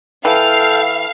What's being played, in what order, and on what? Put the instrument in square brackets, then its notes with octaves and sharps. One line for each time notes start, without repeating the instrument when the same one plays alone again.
[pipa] E3 [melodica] A4 G5 [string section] F5